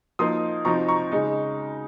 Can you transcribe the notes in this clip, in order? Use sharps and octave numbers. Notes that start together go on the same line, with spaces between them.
F3 A#3 D#4 C6 D#6
C3 F3 C4 D#4 A#5 C#6
A#5 C#6
C#3 G#3 D#4